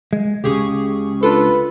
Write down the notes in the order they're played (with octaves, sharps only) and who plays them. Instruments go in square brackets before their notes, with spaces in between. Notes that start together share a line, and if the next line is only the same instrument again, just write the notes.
[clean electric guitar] G#3
[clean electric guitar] C#2 C#3 [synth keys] G4 G#4 C#6
[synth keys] D4 F4 A4 [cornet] B4